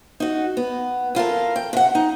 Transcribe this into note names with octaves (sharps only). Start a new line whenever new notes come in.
D#4 F#4
B3
E2 F4 A4 A#4
G5
C3 F#5
D#4